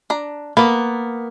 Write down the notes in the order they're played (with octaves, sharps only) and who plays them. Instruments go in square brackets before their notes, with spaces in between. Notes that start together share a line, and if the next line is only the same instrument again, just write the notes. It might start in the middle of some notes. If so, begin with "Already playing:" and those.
[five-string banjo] D4 A#5
[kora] A#3 [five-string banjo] B3 B4